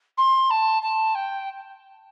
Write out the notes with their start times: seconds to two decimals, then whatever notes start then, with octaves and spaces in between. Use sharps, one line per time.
0.18 C6
0.51 A5
0.82 A5
1.15 G5